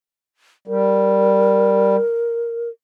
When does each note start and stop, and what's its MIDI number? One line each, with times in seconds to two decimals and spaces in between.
0.67 1.96 55
0.67 2.69 70